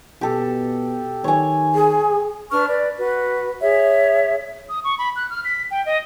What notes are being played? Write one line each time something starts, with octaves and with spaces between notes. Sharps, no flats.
B2 G4 A4
D#3 C#5 G#5
G#4
D4 B4 C#6 F6
B4 D5
F#4 B4
G#4 C#5 E5
D#6
C#6
B5
F#6
F6
B6
G5
D#5